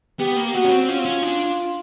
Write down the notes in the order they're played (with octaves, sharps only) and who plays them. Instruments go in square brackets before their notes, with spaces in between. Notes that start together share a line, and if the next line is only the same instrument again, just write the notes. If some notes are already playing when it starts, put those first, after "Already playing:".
[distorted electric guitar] B3 [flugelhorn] G4
[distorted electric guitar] A#3
[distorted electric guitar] B3 [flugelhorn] F#4
[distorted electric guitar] C#4
C4
[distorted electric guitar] C#4 [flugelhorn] F4
[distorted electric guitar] C4
C#4
D4